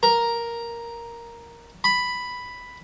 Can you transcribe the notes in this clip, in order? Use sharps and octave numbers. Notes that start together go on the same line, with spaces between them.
A#4
B5